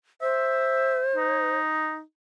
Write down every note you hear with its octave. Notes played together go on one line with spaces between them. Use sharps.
C5 E5
D#4